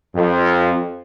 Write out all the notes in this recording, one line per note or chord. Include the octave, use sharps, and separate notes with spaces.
F2